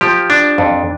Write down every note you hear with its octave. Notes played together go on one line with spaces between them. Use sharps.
F3 G4
D4
F2